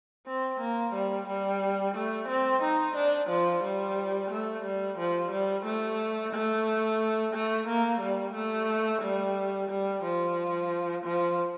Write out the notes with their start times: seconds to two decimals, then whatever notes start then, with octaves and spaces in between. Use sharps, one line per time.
0.27 C4
0.60 A#3
0.95 G3
1.28 G3
1.95 A3
2.29 C4
2.63 D#4
2.97 D4
3.30 F3
3.64 G3
4.31 A3
4.65 G3
4.99 F3
5.32 G3
5.65 A3
6.34 A3
7.34 A3
7.68 A#3
8.01 G3
8.35 A3
9.02 G3
9.71 G3
10.04 F3
11.05 F3